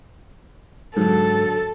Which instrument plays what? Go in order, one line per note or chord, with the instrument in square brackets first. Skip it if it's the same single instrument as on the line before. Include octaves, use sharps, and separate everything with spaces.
[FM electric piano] G#2 [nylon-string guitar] D3 F#3 [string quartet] A4